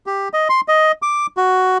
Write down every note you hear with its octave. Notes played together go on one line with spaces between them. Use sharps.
G4
D#5
C6
D#5
D6
F#4